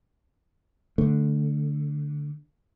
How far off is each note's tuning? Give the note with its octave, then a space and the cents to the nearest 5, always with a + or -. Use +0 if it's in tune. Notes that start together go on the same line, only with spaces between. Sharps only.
D3 +0 A3 +0